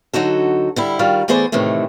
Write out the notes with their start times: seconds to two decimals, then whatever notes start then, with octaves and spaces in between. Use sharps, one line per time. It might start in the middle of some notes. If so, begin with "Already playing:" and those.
0.13 D3 F#3 D#4 F#4 A4
0.76 D3 G3 E4
0.99 D#3 G3 F4 F#4 A#4
1.28 E3 A3 B3 G#4 C5 D5
1.52 A2 C3 D#3 E3 A3